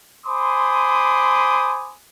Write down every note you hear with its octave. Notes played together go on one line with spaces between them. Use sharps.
C5 G#5 B5 C6 D6 D#6